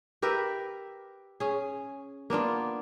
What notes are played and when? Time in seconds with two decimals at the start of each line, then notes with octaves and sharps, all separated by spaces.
0.22 G4 A#4 B4 E5
1.40 C#4 G#4
2.30 A#3 B3 D4 F4